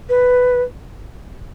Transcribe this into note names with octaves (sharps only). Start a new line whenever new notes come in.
B4